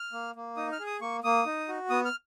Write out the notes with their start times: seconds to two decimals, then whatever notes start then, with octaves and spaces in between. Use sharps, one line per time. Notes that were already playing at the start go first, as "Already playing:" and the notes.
Already playing: F6
0.13 A#3
0.36 A#3
0.57 D#4 D#6
0.72 F6
0.79 G#4
0.87 D#6
1.01 A#3 C#6
1.24 A#3 D#6
1.46 D#4
1.68 F#4
1.90 B3 D#6
2.05 F6